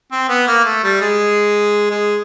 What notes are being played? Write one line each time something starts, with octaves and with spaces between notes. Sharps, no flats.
C4
B3
A#3
A3
G3
G#3
G#3